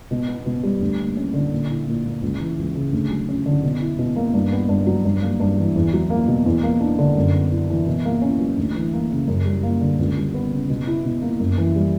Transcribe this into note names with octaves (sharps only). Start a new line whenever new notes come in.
B2
B3
B2
G3
D2
A#3
C#4
D3
A#2
E4
A#2
A#3
C#2
E3
C#2
C#3
D2
F#3
C#4
D3
B2
E4
B2
A#3
G2
B3
G2
F#3
G2
A#3
G2
E3
E2
F#3
A#3
B2
E2
A#3
D4
D3
F#2
B3
E4
E3
B2
A#3
C#4
F#3
D2
E3
A#3
C#3
F#2
G3
A#3
D3
C#2
G3
B3
C#3
B2
E4
B2
A#3
F#2
E3
G3